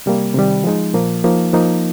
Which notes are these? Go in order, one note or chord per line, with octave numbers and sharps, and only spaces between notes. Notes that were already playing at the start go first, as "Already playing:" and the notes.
C3 G3 A#3
C3 D#3 G3
F3 G#3 D#4
A#2 F3 A#3
F3 A#3 D#4
F3 A#3 D#4